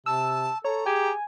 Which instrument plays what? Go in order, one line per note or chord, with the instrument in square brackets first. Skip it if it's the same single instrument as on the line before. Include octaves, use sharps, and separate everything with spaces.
[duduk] C3 [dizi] A5 [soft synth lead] E6
[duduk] A4 [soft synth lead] C#5 [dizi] A#5
[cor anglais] G4 [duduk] G#4 [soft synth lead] G#5